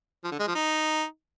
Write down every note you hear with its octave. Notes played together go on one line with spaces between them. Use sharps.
F3
D3
G#3
F3
D#4